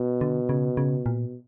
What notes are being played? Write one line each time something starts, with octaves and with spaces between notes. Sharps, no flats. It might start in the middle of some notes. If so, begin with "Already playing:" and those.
Already playing: B2
D3
C#3
C#3
A#2